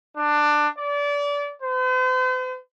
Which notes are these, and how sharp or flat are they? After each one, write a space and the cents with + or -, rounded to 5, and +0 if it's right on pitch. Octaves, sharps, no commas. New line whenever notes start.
D4 +15
D5 -30
C5 -45